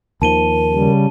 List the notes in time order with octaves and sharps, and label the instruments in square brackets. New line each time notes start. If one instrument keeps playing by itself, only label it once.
[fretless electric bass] D#2 D#3 F3 [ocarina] A#4 [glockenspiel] A5 D#7 G7
[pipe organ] C#3 G3